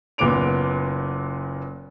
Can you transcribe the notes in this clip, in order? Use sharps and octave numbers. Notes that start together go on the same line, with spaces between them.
F#1 A#2 B3 D6 D7 F7